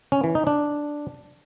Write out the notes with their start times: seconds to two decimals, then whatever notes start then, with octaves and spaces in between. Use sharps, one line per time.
0.12 C#4
0.24 E3
0.35 D#4
0.47 D4